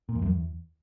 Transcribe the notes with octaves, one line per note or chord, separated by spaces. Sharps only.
A#2
E2
F#2
E2